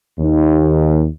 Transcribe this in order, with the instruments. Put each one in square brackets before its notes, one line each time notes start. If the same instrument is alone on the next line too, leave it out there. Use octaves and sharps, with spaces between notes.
[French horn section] D#2